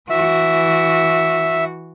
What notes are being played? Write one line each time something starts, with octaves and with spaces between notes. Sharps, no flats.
E3 F#4 E5